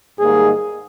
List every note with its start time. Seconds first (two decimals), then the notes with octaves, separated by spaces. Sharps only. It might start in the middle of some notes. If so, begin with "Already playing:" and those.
0.20 G#2 D#3 G3 A#3 G#4